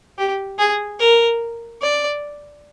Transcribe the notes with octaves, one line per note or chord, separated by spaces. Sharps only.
G4
G#4
A#4
D5